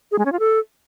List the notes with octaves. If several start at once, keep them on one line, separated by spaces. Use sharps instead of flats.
G#4
G#3
C#4
F4
A4